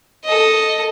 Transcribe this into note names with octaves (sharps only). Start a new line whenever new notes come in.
A4 D#5